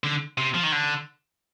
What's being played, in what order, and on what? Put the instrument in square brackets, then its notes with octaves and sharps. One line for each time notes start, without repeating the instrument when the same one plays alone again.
[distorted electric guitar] D3
C3
F3
D#3
D3